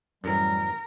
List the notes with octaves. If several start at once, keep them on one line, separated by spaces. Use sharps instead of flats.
F#2 A2 E3 G3 A#4